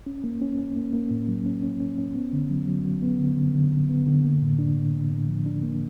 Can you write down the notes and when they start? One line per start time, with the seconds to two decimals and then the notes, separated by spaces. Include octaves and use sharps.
0.06 C#4
0.24 A#3
0.41 C#4
0.58 C#4
0.76 A#3
0.93 A#3
1.11 A2
1.28 F#3
1.46 C#4
1.63 C#4
1.80 C#4
1.98 C#4
2.15 B3
2.33 D3
2.50 F#3
2.67 F#3
2.85 F#3
3.02 B3
3.19 D3
3.37 D3
3.55 D3
3.72 D3
3.89 B3
4.06 D3
4.24 A#3
4.42 A2
4.59 D4
4.76 A2
4.93 A2
5.11 A2
5.28 F3
5.46 D4
5.63 A#3